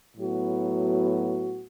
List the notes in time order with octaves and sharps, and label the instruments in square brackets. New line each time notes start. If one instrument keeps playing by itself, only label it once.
[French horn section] A2 F#3 B3 F#4